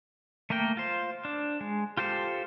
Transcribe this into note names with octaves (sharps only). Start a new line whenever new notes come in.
A3 A#3 A#4 G5
F4 C5
D4
G#3
F4 G4 A4 C5